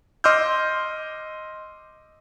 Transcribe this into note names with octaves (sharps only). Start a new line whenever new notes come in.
D#5 C6 D6 E6 F6 G6